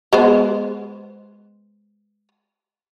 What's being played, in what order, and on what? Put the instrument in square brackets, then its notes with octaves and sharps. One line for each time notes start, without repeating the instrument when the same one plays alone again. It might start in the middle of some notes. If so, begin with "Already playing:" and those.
[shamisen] G#3 B3 C5